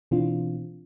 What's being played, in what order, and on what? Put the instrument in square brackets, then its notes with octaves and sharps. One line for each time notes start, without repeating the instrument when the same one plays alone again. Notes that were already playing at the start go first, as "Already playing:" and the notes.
[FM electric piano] B2 E3 C4 D4 F4